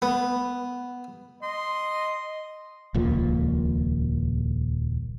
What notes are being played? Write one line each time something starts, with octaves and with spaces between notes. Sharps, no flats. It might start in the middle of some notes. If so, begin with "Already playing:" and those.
B3
D#5 C6
D#1 C#2 A#2 F3